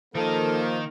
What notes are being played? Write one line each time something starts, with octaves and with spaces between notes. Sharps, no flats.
D#3 F3 A#3 D#4 A4